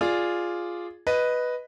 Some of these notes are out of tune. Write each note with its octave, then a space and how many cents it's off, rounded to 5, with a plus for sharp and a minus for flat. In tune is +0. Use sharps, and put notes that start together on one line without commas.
F4 +0 G#4 +0 D5 +0
B4 +0 D#5 +0